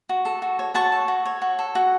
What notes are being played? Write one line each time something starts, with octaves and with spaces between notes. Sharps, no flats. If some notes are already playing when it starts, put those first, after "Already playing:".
F#4
A4
F#4
C#5
F#4 A5 C#6
A4
F#4
C#5
F#4
A4
F#4